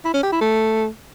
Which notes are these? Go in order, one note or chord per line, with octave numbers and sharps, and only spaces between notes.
E4
C#4
G4
E4
A3